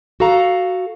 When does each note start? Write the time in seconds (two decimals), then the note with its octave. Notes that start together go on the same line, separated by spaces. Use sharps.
0.20 F#4 A4 F5 A#5